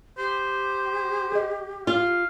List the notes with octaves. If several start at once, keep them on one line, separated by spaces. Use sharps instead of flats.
G4 C5
G#4 D#5
F4 F5